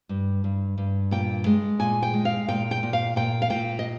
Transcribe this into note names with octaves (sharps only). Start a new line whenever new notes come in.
G2
G2
G2
A#2 G5
G#3
A#2 G#5
G5
G#3
F5
A#2 G5
G5
A#2
F5
A#2 G5
F5
A#2 G5
D#5